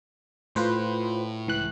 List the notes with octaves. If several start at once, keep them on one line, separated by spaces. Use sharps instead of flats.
A2 F4 B4 C5
C#2 E3 F#6